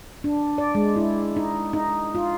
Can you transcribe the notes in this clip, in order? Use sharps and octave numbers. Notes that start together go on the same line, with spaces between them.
D4
D5
G#3
E4
D#4
D#4
F4